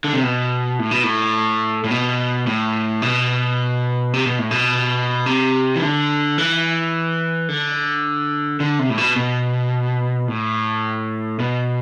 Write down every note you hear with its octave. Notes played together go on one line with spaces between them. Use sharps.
D3
C3
B2
A2
B2
A2
A2
B2
A2
B2
C3
B2
A2
B2
C3
E3
D3
E3
D3
D3
C3
A2
B2
B2
A2
B2